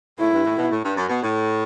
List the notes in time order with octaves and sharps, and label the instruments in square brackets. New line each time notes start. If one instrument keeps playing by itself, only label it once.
[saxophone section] A2 [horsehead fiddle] E4
[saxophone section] G2
A2
B2
A2
G2
F#2
B2
A2